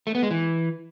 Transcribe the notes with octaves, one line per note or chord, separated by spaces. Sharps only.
A3
B3
G#3
E3